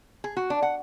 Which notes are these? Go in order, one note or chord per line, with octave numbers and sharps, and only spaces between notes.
G#4
F#4
D4
F#5